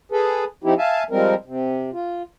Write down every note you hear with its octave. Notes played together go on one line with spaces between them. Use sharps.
G#4 A4 B4
F3 C4 D#4 E4 G4
E5 F5 G#5 A5
F3 G3 G#3 C4 A#4
C3
F4